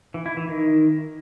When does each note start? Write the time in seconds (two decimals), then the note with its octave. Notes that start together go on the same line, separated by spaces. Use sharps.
0.14 E3
0.26 E4
0.37 E3
0.48 D#3